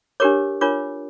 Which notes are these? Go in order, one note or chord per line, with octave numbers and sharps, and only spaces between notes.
D4 G4 A#4 C#5 D6
D4 F4 A#4 C#5 D6